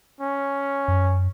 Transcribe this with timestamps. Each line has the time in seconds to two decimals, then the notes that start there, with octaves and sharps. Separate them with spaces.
0.20 C#4
0.88 F#2